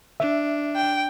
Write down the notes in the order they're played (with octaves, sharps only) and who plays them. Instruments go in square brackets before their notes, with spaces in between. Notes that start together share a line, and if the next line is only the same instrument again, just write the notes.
[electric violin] D4 [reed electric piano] E5
[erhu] G5